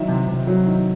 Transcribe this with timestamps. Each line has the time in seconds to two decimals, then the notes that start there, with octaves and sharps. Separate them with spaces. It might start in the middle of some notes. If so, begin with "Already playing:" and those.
Already playing: D#3 F#3 E5
0.08 C3
0.28 C3
0.47 F#3
0.66 D#3